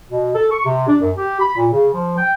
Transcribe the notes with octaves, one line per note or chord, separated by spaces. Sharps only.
B2
A4
C#6
C3
D4
F#2
G4
B5
A#2
C#3
F3
G5